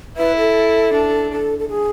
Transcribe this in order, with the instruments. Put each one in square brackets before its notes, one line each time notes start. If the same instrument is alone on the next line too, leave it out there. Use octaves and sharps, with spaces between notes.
[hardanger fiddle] E4 [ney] B4
[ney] A4
[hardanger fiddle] D4
[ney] A4
A4
G#4